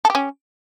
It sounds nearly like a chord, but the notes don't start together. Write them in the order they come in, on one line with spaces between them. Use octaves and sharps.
A4 G4 C#4